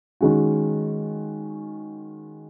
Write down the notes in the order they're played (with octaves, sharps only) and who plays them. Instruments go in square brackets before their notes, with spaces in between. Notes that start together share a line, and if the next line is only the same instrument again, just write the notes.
[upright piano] D#3 G#3 C#4 F#4